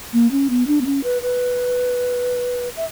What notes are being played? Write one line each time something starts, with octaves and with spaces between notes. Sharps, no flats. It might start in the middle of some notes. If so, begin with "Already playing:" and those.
A#3
C#4
B3
D4
B3
C#4
B4
B4
E5